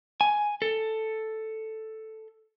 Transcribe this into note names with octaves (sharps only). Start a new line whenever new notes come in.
G#5
A4